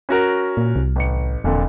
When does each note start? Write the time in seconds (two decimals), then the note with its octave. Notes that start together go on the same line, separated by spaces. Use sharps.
0.09 C#4 F#4 A#4
0.57 A#2
0.76 C2
0.96 A1 C#7
1.44 E1 F2 A#2 D3